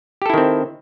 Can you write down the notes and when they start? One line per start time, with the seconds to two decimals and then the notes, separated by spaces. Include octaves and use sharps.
0.22 G4
0.26 A4
0.30 E4
0.34 D#3
0.38 C4